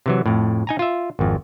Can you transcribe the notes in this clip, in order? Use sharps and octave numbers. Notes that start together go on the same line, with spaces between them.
C3 E3 F#3
F2 A2
D#4 G#5 A#5
F4 E5
G#1 F2